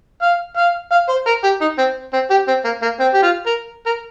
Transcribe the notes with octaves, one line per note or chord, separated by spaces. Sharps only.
F5
F5
F5
C5
A#4
G4
D#4
C4
C4
G4
C4
A#3
A#3
C4
G4
F4
A#4
A#4